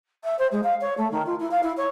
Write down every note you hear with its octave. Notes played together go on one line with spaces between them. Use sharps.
E5
C5
G#3
F5
C#5
A3
D#3
F4
E4
F5
E4
C#5